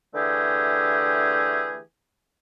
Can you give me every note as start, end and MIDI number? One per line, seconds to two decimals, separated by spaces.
0.14 1.79 50
0.14 1.79 52
0.14 1.79 57
0.14 1.79 67
0.14 1.79 68